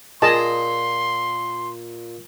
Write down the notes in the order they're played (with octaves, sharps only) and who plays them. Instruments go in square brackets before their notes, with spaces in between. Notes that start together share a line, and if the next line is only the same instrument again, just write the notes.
[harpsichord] A#2 [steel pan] G#4 D#5 A5 [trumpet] C6